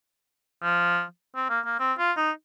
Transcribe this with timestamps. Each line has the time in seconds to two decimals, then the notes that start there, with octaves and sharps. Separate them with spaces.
0.63 F3
1.36 C4
1.50 A#3
1.65 A#3
1.80 C4
1.98 F4
2.17 D#4